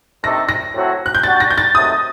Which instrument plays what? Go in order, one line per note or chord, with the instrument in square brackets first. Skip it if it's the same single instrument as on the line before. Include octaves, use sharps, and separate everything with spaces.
[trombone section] C3 D#3 A3 D4 A4 [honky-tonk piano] A#6
[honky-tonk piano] A#6
[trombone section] A2 F#3 C4 F#4 A4
[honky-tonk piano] F#6
G6
[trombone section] G3 D4 F#4 [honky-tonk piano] A6
[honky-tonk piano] A#6
G6
A6
[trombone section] C3 D#3 F#3 A3 [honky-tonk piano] D#6